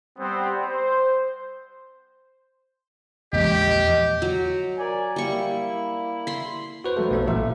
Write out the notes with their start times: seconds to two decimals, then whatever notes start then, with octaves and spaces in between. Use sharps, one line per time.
0.18 G3 B3 C4
0.67 C5
3.33 A#1 E2 G#3 G4 D#5
4.22 F#3
4.78 A#4 D5 G#5
5.16 G3 A#3 E4 C#6
6.27 B5 C6
6.84 F#4 B4 C5
6.96 F#3 A3
7.11 B1 B3 A4
7.27 A1 A#2 F3 E5